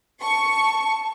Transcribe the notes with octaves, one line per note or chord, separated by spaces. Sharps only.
A5 C#6